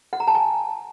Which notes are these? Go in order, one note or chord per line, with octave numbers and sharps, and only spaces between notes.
F#5
A#5
A5
G#5